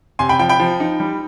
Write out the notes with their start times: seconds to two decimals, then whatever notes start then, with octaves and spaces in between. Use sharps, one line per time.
0.19 C3 G#5 C6
0.29 G5 B5
0.39 F3 G5
0.49 G5 B5
0.60 F3
0.80 D#4
1.00 G3